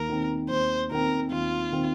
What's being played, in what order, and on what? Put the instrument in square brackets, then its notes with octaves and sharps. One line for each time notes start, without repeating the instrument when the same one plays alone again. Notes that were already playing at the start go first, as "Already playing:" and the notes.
Already playing: [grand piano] D#2 [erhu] A#4
[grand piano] D#3 C4
[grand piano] D#2 [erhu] C5
[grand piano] D#3 C4 [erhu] A#4
[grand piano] D#2 [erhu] F4
[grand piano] D#3 C4